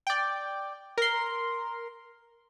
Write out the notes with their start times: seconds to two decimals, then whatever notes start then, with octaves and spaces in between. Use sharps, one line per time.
0.07 D5 G5
0.98 A#4 C6